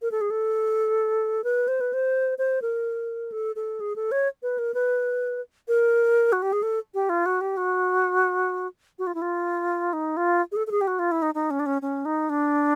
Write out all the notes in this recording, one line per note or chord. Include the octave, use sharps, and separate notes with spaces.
A#4
A4
G#4
A4
B4
C5
B4
C5
C5
A#4
A4
A4
G#4
A4
C#5
B4
A#4
B4
A#4
F#4
G4
G#4
A4
G4
F4
F#4
G4
F#4
F#4
F4
E4
F4
D#4
F4
G#4
A4
A4
G#4
G4
F#4
F4
E4
D#4
D#4
C#4
D4
C#4
C#4
D#4
D4